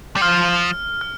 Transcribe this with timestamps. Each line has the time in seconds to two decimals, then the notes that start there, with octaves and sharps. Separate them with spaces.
0.16 G3
0.21 F3 F6
1.01 F6